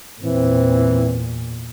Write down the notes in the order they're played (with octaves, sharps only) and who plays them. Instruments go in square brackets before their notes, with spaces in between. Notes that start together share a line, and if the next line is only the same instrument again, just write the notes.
[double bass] E2 A#2 [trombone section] E3 C4